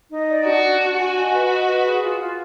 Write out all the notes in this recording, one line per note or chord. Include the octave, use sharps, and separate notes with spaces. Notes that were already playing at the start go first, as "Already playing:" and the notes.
D#4
D5
D4 F#4
D4
D4
F#4 G#5
D#5
B4
D#5
B4
G#4
F4
F4